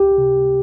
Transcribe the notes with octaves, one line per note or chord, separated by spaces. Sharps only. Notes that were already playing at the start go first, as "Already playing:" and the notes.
Already playing: C#2 G4
C3